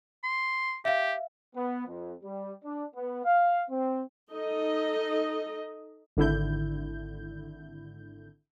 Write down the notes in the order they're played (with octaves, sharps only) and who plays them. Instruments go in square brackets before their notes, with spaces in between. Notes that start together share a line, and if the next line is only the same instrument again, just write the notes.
[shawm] C6
[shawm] G4 [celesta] E5 F5
[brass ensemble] B3
F2
G3
D4
B3
F5
C4
[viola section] D#4 A4 D#5
[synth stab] G#1 D3 E4 G6